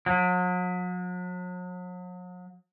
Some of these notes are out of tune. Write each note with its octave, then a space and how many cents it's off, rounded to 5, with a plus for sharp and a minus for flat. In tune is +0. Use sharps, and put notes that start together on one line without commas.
F#3 -40